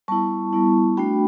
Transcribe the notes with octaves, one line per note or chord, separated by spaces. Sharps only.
G3 B3 E4 A5 C#6
G3 B3 E4
A3 D4 F#4 G5 B5